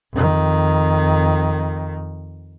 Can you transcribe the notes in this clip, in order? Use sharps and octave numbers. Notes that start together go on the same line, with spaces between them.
F2 D#3